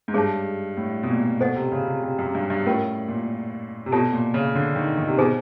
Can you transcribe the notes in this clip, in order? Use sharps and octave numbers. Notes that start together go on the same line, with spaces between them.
G#2
G2 G#4 C#5 E5 A5
A2
B2
A#2
B2 A4 C5 D#5 F#5
C3
C#3
C3
C3
F#2
G2
G2
A2 C#4 F4 A#4
A#2
C3
B2 F4 A4 C#5 E5 A5
A#2
C#3
D3
D#3
D#3
C3
B2 D#4 G#4 C5 D#5